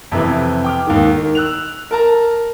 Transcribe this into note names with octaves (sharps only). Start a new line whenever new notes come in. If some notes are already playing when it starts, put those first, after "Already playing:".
F2 C3 E3
G5 D6 F6
D#2 G#2 D#3
D#3
E6 F#6 F7
A#4 A5 A#5